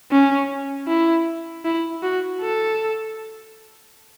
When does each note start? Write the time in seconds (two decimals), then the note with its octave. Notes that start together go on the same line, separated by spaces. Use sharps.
0.11 C#4
0.88 E4
1.65 E4
2.03 F#4
2.41 A4